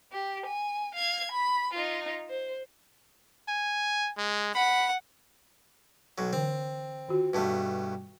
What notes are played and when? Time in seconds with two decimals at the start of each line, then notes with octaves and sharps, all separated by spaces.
0.12 G4
0.46 G#5
0.95 F5 G#6
1.32 B5
1.73 D#4 F4
2.29 C5
3.48 G#5
4.18 G#3
4.55 F#5 B5
6.18 B1 F#3
6.33 D3 E3 C4 G5
7.09 D#3 F4 F#4
7.34 G2 B2 A3 B4 A5